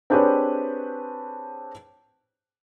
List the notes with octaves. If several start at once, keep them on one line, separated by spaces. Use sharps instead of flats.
C4 D4 G4 G#4 B4 C#5